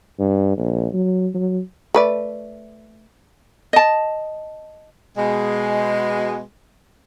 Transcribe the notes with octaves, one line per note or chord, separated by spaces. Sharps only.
G2
A#1
F#3
F#3
A3 B4 D5
D#5 A5
B2 G#3